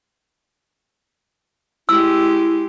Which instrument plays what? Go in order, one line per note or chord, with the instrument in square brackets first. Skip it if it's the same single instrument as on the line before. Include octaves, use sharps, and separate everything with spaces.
[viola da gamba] G#3 G4 [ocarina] E4 [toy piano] E6